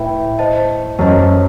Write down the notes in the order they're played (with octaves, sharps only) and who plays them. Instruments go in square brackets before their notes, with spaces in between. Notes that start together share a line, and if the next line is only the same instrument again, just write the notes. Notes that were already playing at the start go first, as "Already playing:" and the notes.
Already playing: [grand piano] A2 [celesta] B4 E5 G5 B5
[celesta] C5 D#5 A5
[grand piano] F#2 [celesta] C5 D#5 A5
[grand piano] F#2